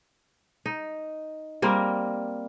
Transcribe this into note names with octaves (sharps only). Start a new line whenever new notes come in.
D#4
G3 A#3 C4 A#4